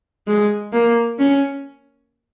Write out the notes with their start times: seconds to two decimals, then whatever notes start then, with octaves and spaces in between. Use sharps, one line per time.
0.27 G#3
0.73 A#3
1.19 C#4